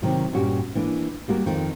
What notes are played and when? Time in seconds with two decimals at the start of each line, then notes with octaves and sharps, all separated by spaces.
0.02 C3 D#3 F#3
0.33 G2 A#2 C#4 F#4 G4
0.75 E3 A#3 D4
1.28 G3 A#3 F#4 A#4
1.46 F2 D#3 F4